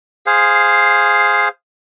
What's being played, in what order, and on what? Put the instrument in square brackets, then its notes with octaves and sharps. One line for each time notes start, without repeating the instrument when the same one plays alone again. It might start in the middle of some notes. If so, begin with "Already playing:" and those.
[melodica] G#4 C5 F5